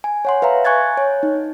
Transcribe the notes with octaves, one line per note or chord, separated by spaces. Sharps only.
G#5
C#5 F#5 C6
B4 E5 F5 A#5
G#5 C#6 F#6 G#6 A6
C#5
D#4